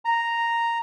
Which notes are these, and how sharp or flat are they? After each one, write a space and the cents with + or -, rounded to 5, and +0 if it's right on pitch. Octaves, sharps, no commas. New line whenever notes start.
A#5 -5